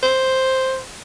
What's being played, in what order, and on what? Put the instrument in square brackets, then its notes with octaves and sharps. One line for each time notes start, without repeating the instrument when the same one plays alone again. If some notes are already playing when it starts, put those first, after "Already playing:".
[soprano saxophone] C5